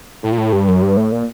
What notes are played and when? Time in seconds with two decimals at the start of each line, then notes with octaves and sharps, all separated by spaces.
0.23 A2
0.32 A#2
0.38 A2
0.53 G2
0.68 F#2
0.82 G2
0.97 A2
1.12 A#2